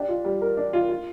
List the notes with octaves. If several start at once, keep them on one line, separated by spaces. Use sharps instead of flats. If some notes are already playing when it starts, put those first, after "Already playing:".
Already playing: D4 G4
F4
G3
A#4
D4
F4
F4